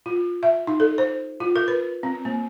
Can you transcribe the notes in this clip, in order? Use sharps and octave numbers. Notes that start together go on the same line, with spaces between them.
F4
E5
D#4
A4
C5
F4
A#4
B4
C4
A#3